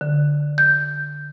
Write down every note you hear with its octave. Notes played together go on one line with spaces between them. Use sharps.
D3
G6